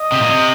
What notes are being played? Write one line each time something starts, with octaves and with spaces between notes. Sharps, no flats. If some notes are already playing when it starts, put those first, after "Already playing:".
Already playing: D#5
C3
A#2
C3